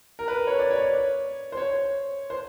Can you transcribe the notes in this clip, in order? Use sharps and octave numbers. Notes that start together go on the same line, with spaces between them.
A#4
B4
C#5
D5
C#5
C5
C#5
C5